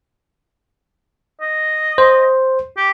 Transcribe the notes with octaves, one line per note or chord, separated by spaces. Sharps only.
D#5
C5
G4